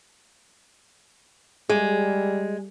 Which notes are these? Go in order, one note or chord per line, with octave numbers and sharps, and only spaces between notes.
G3 G#3 G#4